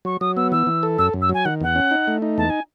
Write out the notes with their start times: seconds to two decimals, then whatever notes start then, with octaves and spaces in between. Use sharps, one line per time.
0.05 F#3 C#6
0.21 F#3 D#6
0.37 B3 E6
0.52 E3 E6
0.67 E3
0.83 A4
0.98 F#2 E6
1.14 F#2
1.22 E6
1.29 F#3 G#5
1.45 D#3 F#5
1.61 E2 F#5
1.76 C#4
1.91 D#4
2.08 A3
2.22 D#4
2.38 E2 A5
2.50 G#5